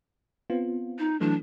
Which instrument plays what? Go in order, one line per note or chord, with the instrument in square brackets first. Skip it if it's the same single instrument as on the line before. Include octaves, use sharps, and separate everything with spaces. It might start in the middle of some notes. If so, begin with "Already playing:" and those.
[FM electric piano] B3 C4 F4
[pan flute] D#4
[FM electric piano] E3 F#3 A3 [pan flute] D4